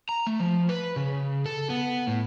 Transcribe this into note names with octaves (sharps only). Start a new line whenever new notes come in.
A#5
A3
F3
B4
C#3
A4
B3
A2